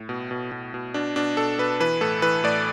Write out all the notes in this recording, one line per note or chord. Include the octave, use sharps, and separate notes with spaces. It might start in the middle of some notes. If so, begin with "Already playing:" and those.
Already playing: A2
B2
B2
B2
B2
B2 D4
B2 D4
B2 A4
B2 B4
E3 B4
A2 A4
E3 B4
A2 D5